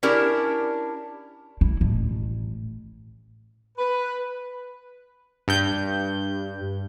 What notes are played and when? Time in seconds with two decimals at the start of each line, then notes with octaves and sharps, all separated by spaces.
0.03 C#4 D4 E4 G4 A#4
1.61 E4
1.81 A1
3.78 B4
5.48 G2 G6